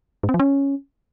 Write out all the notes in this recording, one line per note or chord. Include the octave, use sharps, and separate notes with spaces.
G#2
C4
F3
C#4